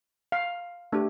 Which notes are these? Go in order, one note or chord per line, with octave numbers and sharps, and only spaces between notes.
F5
A3 D4 G4